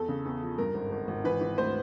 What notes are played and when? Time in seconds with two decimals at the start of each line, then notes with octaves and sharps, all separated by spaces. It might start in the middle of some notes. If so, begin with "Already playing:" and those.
Already playing: E2 A4
0.09 C#3
0.25 E2
0.41 F3
0.58 G2 A#4
0.74 G#1
0.91 G#1
1.08 G#1
1.24 E3 B4
1.41 E3
1.57 D2 C5